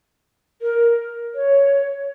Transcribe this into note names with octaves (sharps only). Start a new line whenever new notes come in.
A#4
C#5